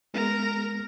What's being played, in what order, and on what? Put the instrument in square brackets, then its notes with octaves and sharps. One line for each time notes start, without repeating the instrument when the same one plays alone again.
[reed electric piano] G#3 B3 [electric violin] A#4 A#5